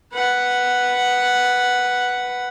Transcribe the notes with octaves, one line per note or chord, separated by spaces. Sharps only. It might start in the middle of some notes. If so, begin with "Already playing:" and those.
B4 F#5